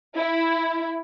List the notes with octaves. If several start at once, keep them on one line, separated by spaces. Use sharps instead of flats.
E4